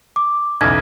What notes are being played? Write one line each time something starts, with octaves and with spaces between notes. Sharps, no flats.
D6
B1 E2 C#3 E5 G#6